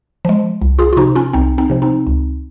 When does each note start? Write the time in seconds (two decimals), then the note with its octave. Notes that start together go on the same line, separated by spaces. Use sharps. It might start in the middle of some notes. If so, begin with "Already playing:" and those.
0.25 F3 G#3
0.62 C2
0.79 F4 G#4
0.93 F4
0.97 C3 F3 D#4 F#4
1.15 C#4 F4
1.33 C2 C4 D#4
1.58 C4 D#4
1.70 C3 F3
1.82 C4 D#4
2.07 C#2